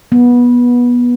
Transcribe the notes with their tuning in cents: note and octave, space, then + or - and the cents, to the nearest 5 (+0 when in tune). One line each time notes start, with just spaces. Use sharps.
B3 -20